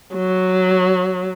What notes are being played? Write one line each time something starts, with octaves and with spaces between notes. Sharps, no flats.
F#3